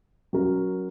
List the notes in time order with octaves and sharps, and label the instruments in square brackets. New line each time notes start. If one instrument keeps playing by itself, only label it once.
[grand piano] F#3 C#4 F#4 A#4